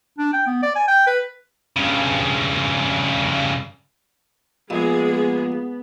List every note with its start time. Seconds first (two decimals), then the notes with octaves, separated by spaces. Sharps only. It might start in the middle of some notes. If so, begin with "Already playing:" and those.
0.18 D4
0.33 G5
0.47 B3
0.63 D5
0.75 G#5
0.88 G5
1.07 B4
1.76 G2 C#3
4.70 A#1 G#3 B3 G#4